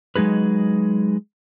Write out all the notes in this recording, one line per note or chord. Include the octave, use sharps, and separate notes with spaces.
F#3 G#3 D#4 G#4 B4